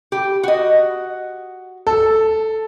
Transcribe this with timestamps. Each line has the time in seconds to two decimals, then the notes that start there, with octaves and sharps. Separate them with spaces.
0.12 G4
0.43 F#4 D#5
1.87 A4